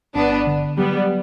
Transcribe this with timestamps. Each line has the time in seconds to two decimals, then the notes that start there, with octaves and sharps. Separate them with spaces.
0.15 G1 B3 D4
0.47 D3
0.78 F#3 G3 B3